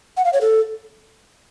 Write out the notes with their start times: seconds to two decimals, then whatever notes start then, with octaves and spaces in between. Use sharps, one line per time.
0.17 F#5
0.25 F5
0.33 C#5
0.41 A4